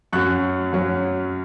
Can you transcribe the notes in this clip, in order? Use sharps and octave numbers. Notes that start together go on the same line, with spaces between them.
F#2 F#3 C#4 C#6 F#6
F#2 F#3 C#4